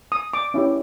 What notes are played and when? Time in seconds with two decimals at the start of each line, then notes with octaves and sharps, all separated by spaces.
0.12 D#6
0.34 D6
0.54 C#4 E4 G4